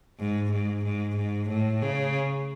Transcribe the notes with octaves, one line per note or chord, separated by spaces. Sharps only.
G#2
G#2
G#2
G#2
A2
C#3